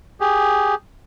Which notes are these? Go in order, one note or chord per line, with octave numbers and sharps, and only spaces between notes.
G4 G#4